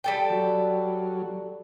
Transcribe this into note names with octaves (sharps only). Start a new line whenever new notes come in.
G3 A4 G5
F#3